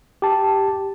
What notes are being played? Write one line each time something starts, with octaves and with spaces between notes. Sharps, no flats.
G4 A5